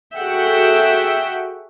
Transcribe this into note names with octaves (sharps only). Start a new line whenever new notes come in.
F#4 G#4 A4 E5 F#5 G5